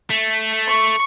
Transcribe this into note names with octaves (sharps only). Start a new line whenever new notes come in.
A3
C#6